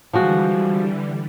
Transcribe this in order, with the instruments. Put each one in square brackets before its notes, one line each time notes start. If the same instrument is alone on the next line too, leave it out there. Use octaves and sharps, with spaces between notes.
[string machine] D3 E3 G3 [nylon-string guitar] F3 G#3 F#4